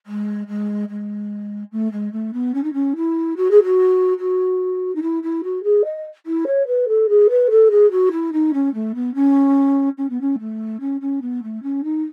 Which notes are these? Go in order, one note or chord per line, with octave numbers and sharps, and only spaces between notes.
G#3
G#3
G#3
A3
G#3
A3
B3
C#4
D#4
C#4
E4
F#4
G#4
F#4
F#4
D#4
E4
E4
F#4
G#4
D#5
E4
C#5
B4
A4
G#4
B4
A4
G#4
F#4
E4
D#4
C#4
A3
B3
C#4
C#4
B3
C#4
A3
C#4
C#4
B3
A3
C#4
D#4